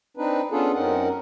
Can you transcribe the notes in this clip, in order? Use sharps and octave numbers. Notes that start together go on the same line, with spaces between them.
C4 D4 D#4 B4
B3 C#4 D4 F4 G#4 A4
F#2 C4 C#4 D#4 A#4 F#5